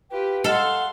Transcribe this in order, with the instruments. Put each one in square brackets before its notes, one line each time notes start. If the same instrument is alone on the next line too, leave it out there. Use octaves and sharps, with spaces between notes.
[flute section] F4 B4 G5 [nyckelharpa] G4
[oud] A4 [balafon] D#5 [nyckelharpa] F5 C6 [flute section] F#5